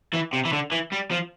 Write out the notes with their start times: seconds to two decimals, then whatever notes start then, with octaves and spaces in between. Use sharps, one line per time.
0.14 E3
0.33 C3
0.45 E3
0.53 D3
0.72 E3
0.92 G3
1.11 F3